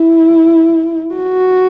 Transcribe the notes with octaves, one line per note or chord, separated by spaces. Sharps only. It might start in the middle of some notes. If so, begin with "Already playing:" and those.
Already playing: E4
F#4